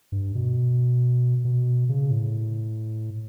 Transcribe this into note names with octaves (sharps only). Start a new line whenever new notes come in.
G2
B2
B2
C#3
A2